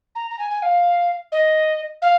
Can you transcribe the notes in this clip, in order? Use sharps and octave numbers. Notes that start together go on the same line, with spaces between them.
A#5
A#5
G#5
G#5
F5
D#5
F5